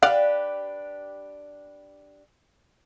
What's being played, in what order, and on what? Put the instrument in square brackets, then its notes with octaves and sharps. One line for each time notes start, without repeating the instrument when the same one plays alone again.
[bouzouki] D4 G4 B4 [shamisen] D5 F5 F#5